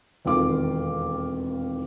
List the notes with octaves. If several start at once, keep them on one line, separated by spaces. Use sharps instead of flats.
E1 F2 D#3 F4 F5 D6